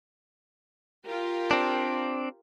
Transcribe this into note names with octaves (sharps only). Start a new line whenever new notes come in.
F4 G4 A#4
C4 D4